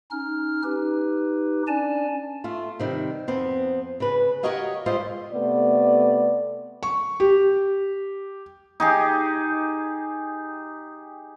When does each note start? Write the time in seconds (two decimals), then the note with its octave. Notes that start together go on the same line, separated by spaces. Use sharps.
0.11 C#4 D#4 F6
0.64 D#4 G4 B4
1.68 C#4 D4 D5 G#5 A5
2.44 A3 F4
2.79 C3 D#3 G3
3.28 F2 B3 C4
4.00 C#3 B4
4.43 F#4 G4 A#4 C#5 D#5 F5
4.86 G3 G#3 F4 C5 D#5 E5
5.32 C3 A3 B3 B4 D5
6.83 C#6
7.20 G4
8.80 D#4 G4 G#4